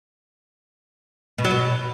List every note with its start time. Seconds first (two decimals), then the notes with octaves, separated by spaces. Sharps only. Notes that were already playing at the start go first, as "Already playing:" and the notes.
1.38 B2
1.45 F#3
1.51 B2